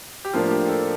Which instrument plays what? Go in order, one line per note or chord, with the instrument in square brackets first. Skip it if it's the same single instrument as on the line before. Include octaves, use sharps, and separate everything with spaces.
[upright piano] G4
[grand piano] A2 F3 A#3 D4 [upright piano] F4
[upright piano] G4
A4